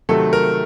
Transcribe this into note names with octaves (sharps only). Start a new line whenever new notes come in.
C3 D#3 F#3 A3 A4
A#4